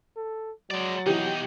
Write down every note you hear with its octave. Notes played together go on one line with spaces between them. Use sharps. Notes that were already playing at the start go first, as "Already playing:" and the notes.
A4
F#3 G#3 D5
B2 E3 D#4 G4